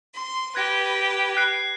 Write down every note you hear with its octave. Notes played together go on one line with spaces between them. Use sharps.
C6
G4 B4 F#6 G#6 A#6
F#6 C7